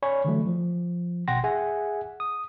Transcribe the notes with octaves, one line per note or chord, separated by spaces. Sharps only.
C#5 D5 G#5 B5 C#6
D3 E3 F#3 A3
F3
G#1 B2 F#5 G5 C6 A#6
G#4 E5 F#5 G#5
D#6